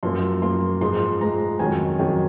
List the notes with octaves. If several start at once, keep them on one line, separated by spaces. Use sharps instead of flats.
F#2 F3 A#3 C6
F#2 F3 A#3 C6
G#2 F3 G#3 C6
G#2 F3 G#3 A#5
F2 D#3 F#3 C#4 G#5
F2 D#3 F#3 C#4